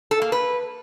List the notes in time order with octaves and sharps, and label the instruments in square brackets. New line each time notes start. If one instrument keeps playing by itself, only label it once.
[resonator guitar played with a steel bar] A4
A#3
B4